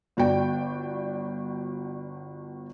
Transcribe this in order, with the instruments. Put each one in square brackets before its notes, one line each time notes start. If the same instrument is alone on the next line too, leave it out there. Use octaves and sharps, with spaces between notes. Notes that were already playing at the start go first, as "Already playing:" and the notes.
[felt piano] G1 F#4 D5 G5